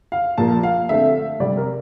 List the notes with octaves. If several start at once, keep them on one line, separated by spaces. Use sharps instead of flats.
F5
A#2 F3 A#3 A5
F5
D3 A3 C4 E5
C3 G3 C4 D5
A#4